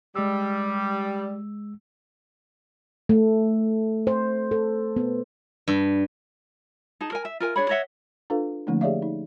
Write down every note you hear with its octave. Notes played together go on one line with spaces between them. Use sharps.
G3 G#3 E6
A3
C5
A4
B3
G2
D#4 G#4 A5
A#4 G#5
E5
F4 A#4 G#5
D4 G#4 C#5 B5
C#5 D#5 E5 F#5
D4 F4 A4 B4 F5
D3 F3 A3 A#3 C#4 D#4
G4 G#4 C#5 D5 E5 F5
D#4